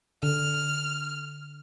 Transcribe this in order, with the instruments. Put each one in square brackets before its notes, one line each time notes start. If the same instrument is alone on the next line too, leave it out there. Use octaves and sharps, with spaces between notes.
[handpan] D3 [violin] F6